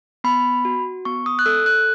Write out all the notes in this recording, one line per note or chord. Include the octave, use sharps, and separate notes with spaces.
B3 B5
F#4
B3 C#6
D#6
F#6
A4 E6
F#6